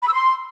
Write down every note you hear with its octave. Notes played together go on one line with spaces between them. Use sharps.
B5
E6
C6